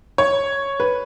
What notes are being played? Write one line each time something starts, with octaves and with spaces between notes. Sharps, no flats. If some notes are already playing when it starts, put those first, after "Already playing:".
C#5
B4